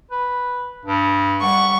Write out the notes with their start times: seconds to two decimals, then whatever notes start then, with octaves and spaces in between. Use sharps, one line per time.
0.11 B4
0.85 G2
1.41 G3 F#5 C#6